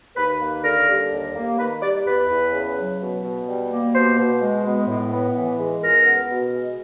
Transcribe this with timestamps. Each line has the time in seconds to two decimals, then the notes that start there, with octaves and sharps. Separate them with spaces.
0.16 D#2 B4
0.40 A#3
0.63 D3 A#4
0.87 G3
1.11 D#2
1.34 A#3
1.58 D#3 B4
1.81 G3 D5
2.05 E2 B4
2.28 E2
2.52 C#3
2.76 F#3
2.99 B2
3.23 B2
3.46 G3
3.70 A#3
3.93 B2 C5
4.17 B2
4.41 G#3
4.64 B3
4.87 A2
5.11 B3
5.35 E3
5.58 G#3
5.82 C#2 A#4
6.05 B3
6.29 B2
6.52 G#3